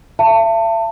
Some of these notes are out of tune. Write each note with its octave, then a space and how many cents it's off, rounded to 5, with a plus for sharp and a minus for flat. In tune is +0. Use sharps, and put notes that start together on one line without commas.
E5 +40 A5 +25